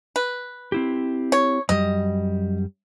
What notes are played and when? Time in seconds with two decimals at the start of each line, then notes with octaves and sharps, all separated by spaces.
0.16 B4
0.72 C4 E4 G4
1.32 C#5
1.69 F#2 G3 D#5